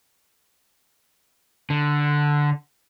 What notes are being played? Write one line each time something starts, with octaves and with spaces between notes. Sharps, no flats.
D3